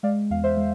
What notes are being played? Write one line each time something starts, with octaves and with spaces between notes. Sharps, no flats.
G#3 D5 F5
E2 F5
C5 E5
G#3